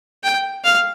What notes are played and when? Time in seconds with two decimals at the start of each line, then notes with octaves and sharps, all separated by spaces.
0.24 G5
0.64 F5